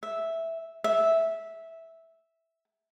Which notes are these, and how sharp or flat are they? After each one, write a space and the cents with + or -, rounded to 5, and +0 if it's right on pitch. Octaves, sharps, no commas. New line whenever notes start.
E5 -5
E5 -10